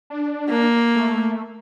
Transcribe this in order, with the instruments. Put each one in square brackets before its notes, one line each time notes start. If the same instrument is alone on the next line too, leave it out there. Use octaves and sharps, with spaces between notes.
[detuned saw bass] D4
[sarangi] A#3
[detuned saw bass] A3